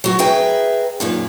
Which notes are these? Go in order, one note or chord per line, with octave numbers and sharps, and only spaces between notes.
F#3 F#4
G#4 B4 E5 G5 A#5
F#2 A#2 D#3